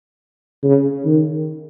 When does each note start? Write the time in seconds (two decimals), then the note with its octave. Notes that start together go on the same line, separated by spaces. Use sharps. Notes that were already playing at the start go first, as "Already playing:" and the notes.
0.63 C#3
1.05 D#3